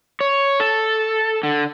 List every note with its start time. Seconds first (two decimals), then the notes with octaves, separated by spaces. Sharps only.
0.21 C#5
0.60 A4
1.43 D3